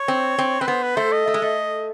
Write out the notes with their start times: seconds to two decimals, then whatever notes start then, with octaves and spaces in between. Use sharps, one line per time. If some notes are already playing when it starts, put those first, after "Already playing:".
Already playing: C#5
0.08 C4
0.38 C4
0.61 C4 B4
0.67 B3 C5
0.83 B4
0.97 A3 C5
1.12 D#5
1.27 A3
1.34 G#3
1.42 A3